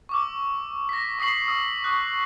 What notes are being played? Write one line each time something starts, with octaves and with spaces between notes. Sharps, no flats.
C#6 D6 E6
A#6 B6
C#6 D#6 B6 C7 F#7
D#6 E6
C#6 D#6 F#6